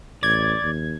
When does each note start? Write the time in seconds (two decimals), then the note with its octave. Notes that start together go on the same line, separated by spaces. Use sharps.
0.23 A1 D5 G#6
0.63 D#2